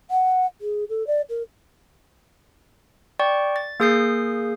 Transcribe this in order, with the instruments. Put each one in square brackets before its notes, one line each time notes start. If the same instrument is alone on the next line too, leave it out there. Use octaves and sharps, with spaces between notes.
[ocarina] F#5
G#4
A4
D5
A#4
[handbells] D5 G5 C#6
A6
A#3 G#4 D#6 G6 C7